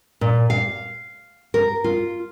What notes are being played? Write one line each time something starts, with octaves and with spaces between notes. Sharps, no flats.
A#2
F5
A#4
F4